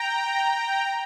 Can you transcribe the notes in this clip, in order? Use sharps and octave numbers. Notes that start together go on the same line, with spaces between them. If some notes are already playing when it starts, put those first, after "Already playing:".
Already playing: G5 A#5